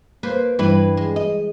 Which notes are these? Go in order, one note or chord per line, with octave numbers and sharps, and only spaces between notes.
A#3 B4 C5
G2 E3 E4 B4
G#3
D#5